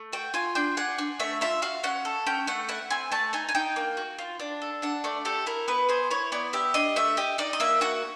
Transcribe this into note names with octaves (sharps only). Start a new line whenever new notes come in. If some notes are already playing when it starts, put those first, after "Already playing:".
Already playing: A3
F#4 G5
F4 G#5
D4 G5
G#4 F#5
D4
A3 E5
F4 E5
F#4 F5
C#4 F#5
A4
C#4 G5
A3 F#5
E4 F#5
C4 G#5
A3 A5
D#4 G#5
G#5
D#4 G5
A#3
F#4
F4
D4
A4
D4 F#5
A3 D5
G4 A4
E4 A#4
B3 B4
G#4 C5
E4 C#5
B3 D5
G4 E5
D4 D#5
A3 E5
G4 D#5
D#4 D5
D#5
A#3 E5
F#4 F#5